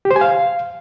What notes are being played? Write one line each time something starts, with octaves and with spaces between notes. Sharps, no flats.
G4
C5
G#5
F5